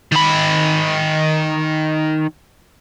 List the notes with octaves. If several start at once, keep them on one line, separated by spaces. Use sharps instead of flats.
D#3 B5